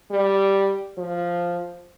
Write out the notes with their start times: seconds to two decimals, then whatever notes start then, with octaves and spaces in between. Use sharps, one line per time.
0.11 G3
0.98 F3